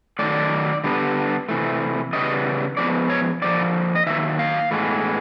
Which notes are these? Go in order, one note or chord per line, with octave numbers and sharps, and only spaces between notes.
D#3 F#3 A3 D5
D3 G3 B3
C3 E3 A3
C#3 E3 G3 B3 D#5
A2 F3 G#3 B3 D5
C#5
D3 F3 A#3 D5
D#5
D#3 F#3 A#3 E5
F5
A2 E3 G#3 B3